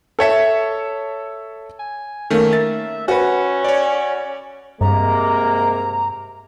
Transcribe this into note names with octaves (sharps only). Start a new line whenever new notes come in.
A4 C#5 E5
G#5
D#3 A3 A#3 C#4
E5 A6
C#4 F#4 B4
C#5 D5
G2 C3 G#3 A#3 A#5